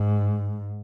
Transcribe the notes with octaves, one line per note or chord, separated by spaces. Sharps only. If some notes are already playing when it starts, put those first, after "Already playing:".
Already playing: G#2